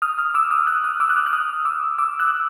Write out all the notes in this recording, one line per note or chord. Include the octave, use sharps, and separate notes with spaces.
D#6 F6
D#6 F6
D6 E6
D#6 F6
E6 F#6
D#6 F6
D6 E6
F#6
D#6 F6
F#6
D#6 F6
D6 E6
D6 E6
E6 F#6